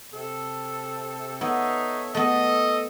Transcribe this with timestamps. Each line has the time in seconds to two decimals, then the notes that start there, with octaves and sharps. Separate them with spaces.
0.13 C3 A4
1.41 B3 D#4 A4 C#5 E5
2.15 A3 B3 A4 D#5